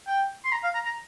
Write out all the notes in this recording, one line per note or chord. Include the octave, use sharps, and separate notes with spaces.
G5
C6
A#5
F5
A#5
A#5